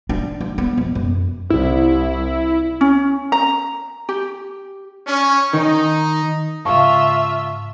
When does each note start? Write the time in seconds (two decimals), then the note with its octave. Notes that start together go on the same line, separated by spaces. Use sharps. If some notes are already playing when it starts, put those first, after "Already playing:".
0.09 D4
0.41 D4
0.58 B3
0.77 F2
0.95 F#2
1.50 C2 E4
2.81 C#4
3.32 A#5
4.09 G4
5.07 C#4
5.53 D#3 D#4
6.65 G#2 C#3 F4 E5 F5 A5 C#6